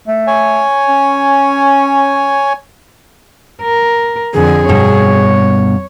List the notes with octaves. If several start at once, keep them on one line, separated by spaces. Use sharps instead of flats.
A3
C#5 G#5
C#4
A#4
F2 D3 G#4
G2 B2 C#5